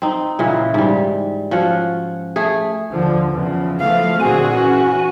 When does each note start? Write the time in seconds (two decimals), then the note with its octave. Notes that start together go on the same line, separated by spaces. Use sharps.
0.02 C4 D#4
0.39 A#2 C#3 E3
0.74 G#2 G3
1.51 F3 C#4 F#4 F#5
2.36 A3 G#4
2.92 D#2 D3 F3
3.30 E2 C#3 F3
3.80 E3 F3 A3 F5
4.20 A#2 D3 C4 F#4 G#4 G#5
4.50 E3 C#4 F#4